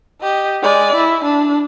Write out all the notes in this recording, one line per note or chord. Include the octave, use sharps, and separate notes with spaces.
G4 D#5
G#3 D5
E4
D4